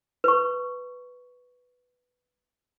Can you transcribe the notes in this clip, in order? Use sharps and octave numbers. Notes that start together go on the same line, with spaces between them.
B4 C#6